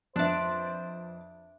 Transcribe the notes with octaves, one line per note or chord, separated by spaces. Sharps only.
F2 D4 B4 C5 D5 E5 F#6